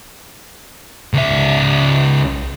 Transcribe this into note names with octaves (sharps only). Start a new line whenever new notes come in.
C#2 E5